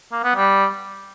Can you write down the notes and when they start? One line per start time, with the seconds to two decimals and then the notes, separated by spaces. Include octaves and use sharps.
0.12 A#3
0.24 B3
0.36 G3